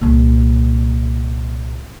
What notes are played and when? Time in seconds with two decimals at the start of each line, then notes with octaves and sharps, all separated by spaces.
0.01 C2 A#2